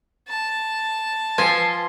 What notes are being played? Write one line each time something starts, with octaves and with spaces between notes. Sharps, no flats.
A5
F3 B4 G#5 C6